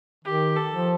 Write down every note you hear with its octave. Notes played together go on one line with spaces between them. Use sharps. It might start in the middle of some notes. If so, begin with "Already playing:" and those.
D#3 G4
A4
F3